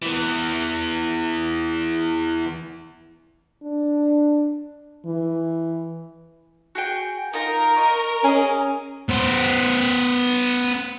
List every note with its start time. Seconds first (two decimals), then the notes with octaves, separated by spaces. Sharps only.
0.02 E3 B3
3.63 D4
5.06 E3
6.75 F#4 G#4 G5
7.34 D#4 F4 A#4 A#5
7.76 D#5 C#6
8.24 C#4 G#4 D#5
9.10 B3 C5